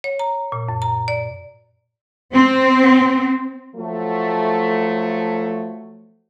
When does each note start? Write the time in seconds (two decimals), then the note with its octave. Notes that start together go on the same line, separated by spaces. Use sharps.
0.04 C#5
0.19 A#5
0.52 A#2
0.68 F#2
0.82 A#5
1.08 D5
2.33 C4
3.75 F3 F#3 A3